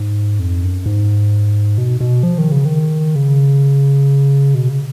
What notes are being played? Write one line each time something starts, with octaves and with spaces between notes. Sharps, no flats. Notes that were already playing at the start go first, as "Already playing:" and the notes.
Already playing: G#2
F2
F#2
G#2
B2
B2
F3
D#3
C#3
D#3
C#3
B2
C#3